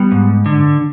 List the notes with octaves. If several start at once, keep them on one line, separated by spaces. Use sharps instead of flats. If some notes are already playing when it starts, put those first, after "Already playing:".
Already playing: G3 B3
G#2
D3